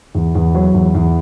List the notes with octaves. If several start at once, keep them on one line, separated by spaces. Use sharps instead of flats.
E2
E2
F#3
E2
E2